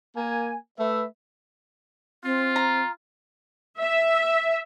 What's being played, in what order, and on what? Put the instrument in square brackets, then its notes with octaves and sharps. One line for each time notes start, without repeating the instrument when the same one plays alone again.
[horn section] A#3 G#5
A3 B4 E5
[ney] C4 [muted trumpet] F4
[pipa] A#5
[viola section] E5